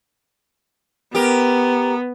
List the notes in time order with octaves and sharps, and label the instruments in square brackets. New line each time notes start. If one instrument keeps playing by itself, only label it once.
[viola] B3 [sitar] G4 A#4